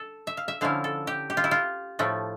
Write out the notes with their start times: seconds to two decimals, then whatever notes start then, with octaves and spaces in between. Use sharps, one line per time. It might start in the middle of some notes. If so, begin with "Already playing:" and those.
Already playing: A4
0.27 E5
0.37 F5
0.48 E5
0.61 D3 F3 C#4 E4 F5
0.84 A4
1.07 G4
1.30 G4
1.37 F4
1.44 E4
1.51 F4
1.99 A2 F3 A3